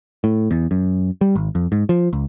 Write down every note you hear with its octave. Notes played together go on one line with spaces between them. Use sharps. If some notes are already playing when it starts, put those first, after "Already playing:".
A2
E2
F#2
G3
G#1
F2
G#2
F3
C#2